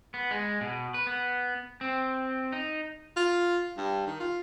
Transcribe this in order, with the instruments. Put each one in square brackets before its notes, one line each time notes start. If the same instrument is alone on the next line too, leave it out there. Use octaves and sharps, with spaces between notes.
[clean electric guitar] B3
G#3
B2
B4
B3
C4
D#4
[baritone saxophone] F4
G2
D#3
F4